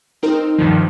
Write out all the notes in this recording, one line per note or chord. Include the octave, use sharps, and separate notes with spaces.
C4 D#4 A#4
G2 D#3 F3